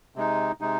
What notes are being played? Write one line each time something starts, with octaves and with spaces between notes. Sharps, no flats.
C3 G#3 D#4
C3 G#3 D#4